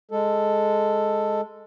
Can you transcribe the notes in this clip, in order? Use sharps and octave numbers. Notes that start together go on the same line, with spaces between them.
G#3 A4